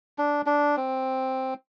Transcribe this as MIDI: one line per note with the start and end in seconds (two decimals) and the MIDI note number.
0.18 0.42 62
0.46 0.76 62
0.77 1.54 60